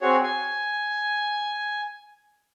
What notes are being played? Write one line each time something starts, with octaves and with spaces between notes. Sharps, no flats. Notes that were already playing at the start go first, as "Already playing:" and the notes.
C4 F#4 G#4 C#5
G#5